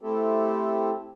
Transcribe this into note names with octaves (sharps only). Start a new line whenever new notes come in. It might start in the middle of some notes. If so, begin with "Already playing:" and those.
A3 C4 E4 G4 A4